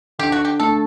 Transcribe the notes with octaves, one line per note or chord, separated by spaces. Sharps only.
D3 G4
F#4
G4
A3 A4